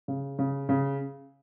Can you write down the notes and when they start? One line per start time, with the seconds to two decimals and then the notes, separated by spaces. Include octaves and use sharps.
0.08 C#3
0.39 C#3
0.69 C#3